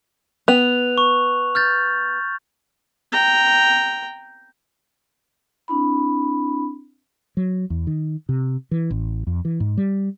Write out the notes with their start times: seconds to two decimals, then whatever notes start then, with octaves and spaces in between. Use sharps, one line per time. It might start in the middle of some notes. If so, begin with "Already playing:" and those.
0.48 B3 F#6 F7
0.98 C#6
1.55 F6 G6 A6
3.12 G5 A#5
5.68 C4 D4 E4 B5
7.37 F#3
7.70 E2
7.87 D#3
8.29 C3
8.71 E3
8.90 A1
9.27 F2
9.45 E3
9.60 G#2
9.77 G3